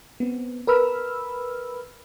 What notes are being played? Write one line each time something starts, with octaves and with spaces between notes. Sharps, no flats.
B3 C4
A#4 B4 B5 E6 F6